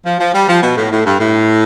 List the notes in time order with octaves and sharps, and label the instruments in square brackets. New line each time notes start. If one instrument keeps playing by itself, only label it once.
[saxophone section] F3
F3
G3
F3
B2
A2
A2
G2
A2